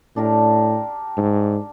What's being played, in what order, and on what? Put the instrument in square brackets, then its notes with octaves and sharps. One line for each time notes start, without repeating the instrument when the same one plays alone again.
[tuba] A2 [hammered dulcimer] D4 G4 A#4
[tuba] G#2